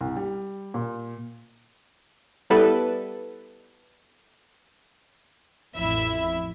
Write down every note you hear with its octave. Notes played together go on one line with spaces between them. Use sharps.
C2
G3
A#2
G3 B3 E4 A4 B4
A1 F2 E4 E5 B5